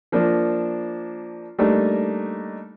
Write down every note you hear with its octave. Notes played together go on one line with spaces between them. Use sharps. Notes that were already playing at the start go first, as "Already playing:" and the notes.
F3 A#3 D4
G3 A3 A#3 D4 D#4